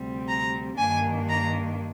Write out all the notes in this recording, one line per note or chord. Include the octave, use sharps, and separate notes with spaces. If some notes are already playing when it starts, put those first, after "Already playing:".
Already playing: D2 C3 G3 C4
A#5
G2 D#3 A#3 D4 G#5
A#5